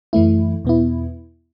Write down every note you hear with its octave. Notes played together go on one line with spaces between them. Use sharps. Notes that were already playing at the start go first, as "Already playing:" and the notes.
F#2 E3 A3 E4
E2 B2 B3 E4